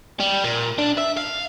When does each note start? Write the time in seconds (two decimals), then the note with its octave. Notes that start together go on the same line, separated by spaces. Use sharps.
0.20 G3
0.44 A#2
0.79 D4
0.98 E5
1.17 F5